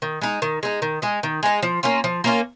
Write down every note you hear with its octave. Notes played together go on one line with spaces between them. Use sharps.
D#3
G#3 D#4
D#3
G#3 D#4
D#3
G#3 D#4
D#3
G#3 D#4
F3
A#3 C#4 F4
F3
A#3 C#4 F4